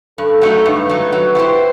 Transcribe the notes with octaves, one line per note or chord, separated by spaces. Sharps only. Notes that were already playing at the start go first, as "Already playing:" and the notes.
G2 A4
F#3 A3 D#4
G2 B4
F#3 A3 D#4
F#3
A3 E4 G4 C5